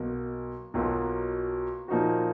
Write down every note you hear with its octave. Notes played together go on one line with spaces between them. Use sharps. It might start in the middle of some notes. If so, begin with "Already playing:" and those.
Already playing: B1 B2 A#3
B1 B2 F#3 A#3 F4
A#2 F3 A#3 D#4 F#4